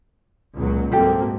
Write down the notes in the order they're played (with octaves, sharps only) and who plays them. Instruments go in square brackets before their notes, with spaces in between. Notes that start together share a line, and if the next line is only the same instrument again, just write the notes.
[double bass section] C#2 A#2 F#3
[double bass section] G#2 A#3 C4 [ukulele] F#4 G4 A4